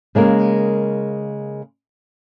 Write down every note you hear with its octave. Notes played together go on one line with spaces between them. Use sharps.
C#3 G#3 A#3 A#4